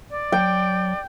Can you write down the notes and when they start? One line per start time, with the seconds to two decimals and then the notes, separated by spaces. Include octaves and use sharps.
0.10 D5
0.32 F#3 G5